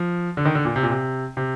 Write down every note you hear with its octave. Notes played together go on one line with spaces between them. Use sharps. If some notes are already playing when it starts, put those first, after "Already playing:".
Already playing: F3
D3
D#3
D3
A#2
C3
A#2
C3
C3